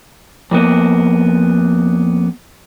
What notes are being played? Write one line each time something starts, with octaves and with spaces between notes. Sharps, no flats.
F2 A#3 B3